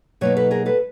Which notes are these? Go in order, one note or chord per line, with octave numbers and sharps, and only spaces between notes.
B2 F#3 A#3 D#4 B4 C#5
A4 B4
G#4 A#4
A4 B4